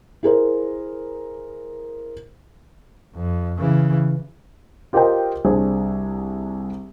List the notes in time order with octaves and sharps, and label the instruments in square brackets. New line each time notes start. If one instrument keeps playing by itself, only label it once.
[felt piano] E4 G#4 A#4 C5
[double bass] F2
C#3 E3
[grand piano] F4 G4 A#4 C5 D#5 G5
C2 D4 G#4 C5